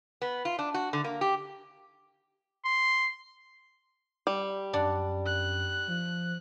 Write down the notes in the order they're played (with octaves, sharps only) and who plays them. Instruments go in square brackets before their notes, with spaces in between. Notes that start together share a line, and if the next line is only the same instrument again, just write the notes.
[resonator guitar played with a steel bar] B3
F4
D4
F#4
D3
A#3
G4
[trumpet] C6
[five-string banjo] G3
[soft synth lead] F#2 [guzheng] D4 D5 F#5
[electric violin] F#6
[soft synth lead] F3